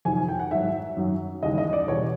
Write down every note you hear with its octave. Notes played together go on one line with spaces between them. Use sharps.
F2 C3 D#3 F#3 G#5
G#5
G5
F#5
G#2 D#3 F#3 E5
F#2 D#3 F#3
D#2 C#3 E3 G3 D#5
D#5
D5
E2 B2 G3 C#5